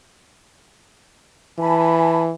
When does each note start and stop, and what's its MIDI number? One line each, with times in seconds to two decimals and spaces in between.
1.59 2.32 52
1.59 2.21 80
1.59 2.21 81
1.59 2.21 83